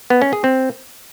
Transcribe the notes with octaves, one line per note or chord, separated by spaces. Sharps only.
B3
C#4
G#4
C4